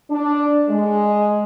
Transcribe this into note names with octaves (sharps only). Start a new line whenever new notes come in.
D4
G#3